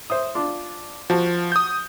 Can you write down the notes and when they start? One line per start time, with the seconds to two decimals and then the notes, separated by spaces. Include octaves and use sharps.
0.10 C5 E5 D#6
0.35 D4 F4
1.10 F3 F#4 A5
1.52 D#6 G6